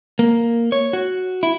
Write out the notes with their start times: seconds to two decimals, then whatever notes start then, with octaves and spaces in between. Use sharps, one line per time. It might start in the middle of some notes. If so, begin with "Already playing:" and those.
0.19 A#3
0.72 C#5
0.93 F#4
1.43 E4